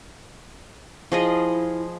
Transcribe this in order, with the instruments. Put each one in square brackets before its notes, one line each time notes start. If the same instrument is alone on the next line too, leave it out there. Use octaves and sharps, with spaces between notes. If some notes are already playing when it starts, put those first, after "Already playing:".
[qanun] F3 G#4 D#5 [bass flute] E4